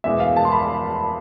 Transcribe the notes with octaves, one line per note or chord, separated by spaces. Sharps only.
E2 B2 G#3 E5
F5
A5
C6
B5